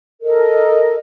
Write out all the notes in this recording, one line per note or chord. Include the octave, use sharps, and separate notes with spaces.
A4 A#4 D#5